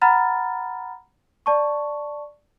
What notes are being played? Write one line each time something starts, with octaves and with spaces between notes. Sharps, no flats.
F#5 A#5 B5 F6 A6
D5 A5 C#6